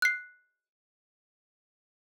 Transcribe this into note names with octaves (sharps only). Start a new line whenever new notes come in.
F#6 C7